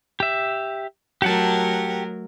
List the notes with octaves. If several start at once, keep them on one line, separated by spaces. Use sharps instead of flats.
G4 E5
F#3 A3 G4 A#4 F#5 A5